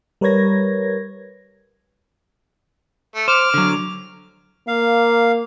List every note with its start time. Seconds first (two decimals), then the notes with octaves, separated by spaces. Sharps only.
0.21 G3 A#4 B4 C#5 G#6 A#6
3.15 A3
3.28 C5 D6 F6
3.54 D3 F#3
4.68 A#3 F5